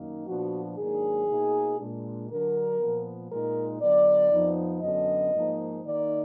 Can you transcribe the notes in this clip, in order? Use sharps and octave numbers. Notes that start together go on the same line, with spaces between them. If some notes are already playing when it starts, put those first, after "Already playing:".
Already playing: F#2 D#3 A#3 D#4
A#2 F3 B3 D4 F#4
G#2 D#3 F#3 A#3 D4 G#4
B2 A#3 D#4
A#2 G#3 D4
D3 F#3 D4 A#4
A#2 F3 B3
A#2 G#3 D#4 A#4
D3 F#3 B3 D5
F2 F3 B3 D#4
F#2 D3 F#3 B3 D4 D#5
G#2 F3 A#3 D#4
D#3 A#3 D#4 D5